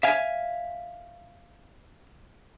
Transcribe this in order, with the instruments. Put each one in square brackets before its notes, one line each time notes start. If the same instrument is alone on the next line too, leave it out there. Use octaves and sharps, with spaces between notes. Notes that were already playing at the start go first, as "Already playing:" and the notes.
[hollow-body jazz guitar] E5 F5 G#5